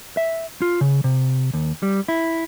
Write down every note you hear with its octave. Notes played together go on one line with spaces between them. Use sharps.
E5
F4
C#3
C3
D#2
G3
E4